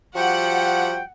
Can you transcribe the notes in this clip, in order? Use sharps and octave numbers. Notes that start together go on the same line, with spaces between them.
F3 G3 F#4 F#5 G5